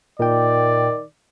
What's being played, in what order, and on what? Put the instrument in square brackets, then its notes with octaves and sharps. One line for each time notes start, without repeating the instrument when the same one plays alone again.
[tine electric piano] A#2 G5 [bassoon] D#3 [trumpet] D5